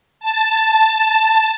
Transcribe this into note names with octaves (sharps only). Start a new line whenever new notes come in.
A5